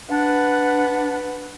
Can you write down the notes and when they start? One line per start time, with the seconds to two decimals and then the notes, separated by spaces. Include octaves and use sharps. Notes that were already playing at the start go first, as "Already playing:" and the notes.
0.11 D4 B4 F#5